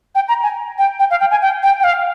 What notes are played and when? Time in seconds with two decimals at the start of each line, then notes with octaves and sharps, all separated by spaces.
0.15 G5
0.28 A#5
0.43 G#5
0.78 G5
0.99 G5
1.11 F5
1.21 G5
1.31 G#5
1.42 G5
1.63 G5
1.80 G5
1.84 F5